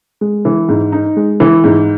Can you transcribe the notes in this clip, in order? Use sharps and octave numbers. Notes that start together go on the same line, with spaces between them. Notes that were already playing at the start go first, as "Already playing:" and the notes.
G#3
E3
G#2
D#4
G#3
E3
G#2